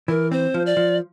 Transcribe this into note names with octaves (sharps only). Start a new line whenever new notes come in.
E3 A#4
C4 C5
F3
D5
F3